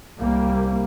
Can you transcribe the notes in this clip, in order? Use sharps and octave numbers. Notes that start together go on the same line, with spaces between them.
C2 G3 A#3